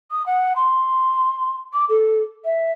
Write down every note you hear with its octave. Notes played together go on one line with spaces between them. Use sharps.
D#6
F#5
C6
D6
A4
E5